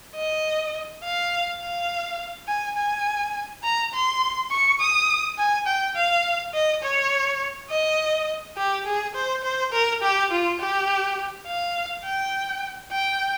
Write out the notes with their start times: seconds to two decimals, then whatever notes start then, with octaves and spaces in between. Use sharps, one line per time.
0.16 D#5
1.03 F5
1.61 F5
2.48 G#5
2.77 G#5
3.64 A#5
3.93 C6
4.51 C#6
4.80 D#6
5.38 G#5
5.67 G5
5.96 F5
6.54 D#5
6.83 C#5
7.70 D#5
8.57 G4
8.86 G#4
9.15 C5
9.43 C5
9.72 A#4
10.02 G4
10.31 F4
10.60 G4
11.47 F5
12.04 G5
12.92 G5